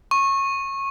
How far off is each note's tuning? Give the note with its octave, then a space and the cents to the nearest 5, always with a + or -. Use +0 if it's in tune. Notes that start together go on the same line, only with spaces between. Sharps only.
C#6 -20